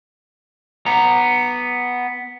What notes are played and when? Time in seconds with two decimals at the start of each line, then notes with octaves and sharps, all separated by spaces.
0.86 B3 A#5